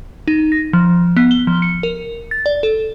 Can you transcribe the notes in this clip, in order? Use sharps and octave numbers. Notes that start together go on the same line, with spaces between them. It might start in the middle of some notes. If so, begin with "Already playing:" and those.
D#4
A#6
F3
B3
G7
F3
C#7
A#4
A6
D5
A4